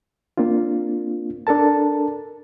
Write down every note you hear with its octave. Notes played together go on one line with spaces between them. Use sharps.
A#3 C4 D4 F4
D4 A4 A#4 A5